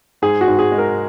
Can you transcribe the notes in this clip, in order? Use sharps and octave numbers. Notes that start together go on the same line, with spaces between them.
G#2 G#4
F#4
G#2
G#4
G#3
A#4